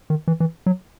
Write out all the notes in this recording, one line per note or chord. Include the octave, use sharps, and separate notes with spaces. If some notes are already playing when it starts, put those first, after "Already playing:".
D#3
E3
E3
F#3